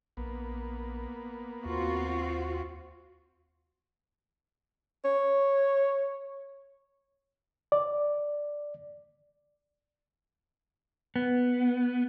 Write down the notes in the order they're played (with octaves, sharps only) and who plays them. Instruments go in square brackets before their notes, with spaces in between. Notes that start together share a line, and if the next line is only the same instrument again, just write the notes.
[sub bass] A#1 [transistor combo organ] A#3 B3
[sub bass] D#2 [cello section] C4 F4 F#4
[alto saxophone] C#5
[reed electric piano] D5
[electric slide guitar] B3